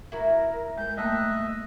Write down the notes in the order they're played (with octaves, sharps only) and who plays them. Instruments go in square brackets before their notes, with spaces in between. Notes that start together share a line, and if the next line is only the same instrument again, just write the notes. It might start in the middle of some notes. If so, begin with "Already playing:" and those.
[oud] E4 F#4 [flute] A#4
[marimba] G#3 A#4 [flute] G6
[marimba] G3 A3 A#3 [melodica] D#5 E5 [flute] F#6